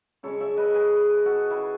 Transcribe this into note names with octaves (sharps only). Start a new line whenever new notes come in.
C#3 G#3 C#4 A4 C#5
C#5 E5
B4 D#5
G#4 B4
F#4 A4
E4 G#4